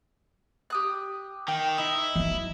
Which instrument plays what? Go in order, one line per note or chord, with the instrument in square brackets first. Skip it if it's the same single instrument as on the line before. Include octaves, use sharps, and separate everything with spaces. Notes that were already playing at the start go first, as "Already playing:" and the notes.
[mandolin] G4 D#6 F#6
[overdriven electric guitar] D#3 [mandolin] G5
[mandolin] D#4 [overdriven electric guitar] E4
[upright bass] E3 F#3